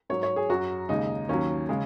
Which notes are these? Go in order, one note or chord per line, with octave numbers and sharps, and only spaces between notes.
G#2 F#3 C#5
C#5
G#4
F#2 F#3 F#4
D#2 C#3 G#3 D#4
D#2 D#3 F#3 C#4
C#3 G#3